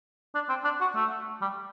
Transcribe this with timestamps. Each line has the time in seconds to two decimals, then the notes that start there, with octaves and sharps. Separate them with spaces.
0.35 D4
0.49 C4
0.64 D4
0.81 F#4
0.95 A3
1.41 G3